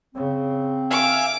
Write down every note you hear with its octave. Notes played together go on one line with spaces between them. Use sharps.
C#3 C4
E5 F5 G#5 D6